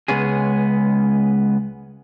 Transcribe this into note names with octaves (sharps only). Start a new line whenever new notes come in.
C#2 G#3 B3 C#4 G#4